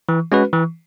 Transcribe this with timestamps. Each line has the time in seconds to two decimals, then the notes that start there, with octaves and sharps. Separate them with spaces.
0.09 E3
0.32 G#3 C#4 F#4 B4
0.53 E3